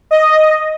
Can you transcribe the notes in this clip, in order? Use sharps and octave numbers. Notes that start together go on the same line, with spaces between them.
D#5